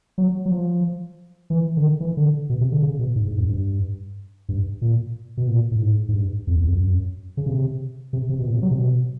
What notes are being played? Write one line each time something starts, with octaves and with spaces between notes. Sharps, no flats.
F#3
F#3
F3
E3
D3
D#3
E3
D3
B2
C3
D3
C#3
B2
G#2
G#2
F#2
G2
G2
A#2
B2
A#2
A2
G#2
G#2
G2
F2
E2
F2
F#2
C#3
C3
C3
C3
B2
A#2
C3
F#3
C3
B2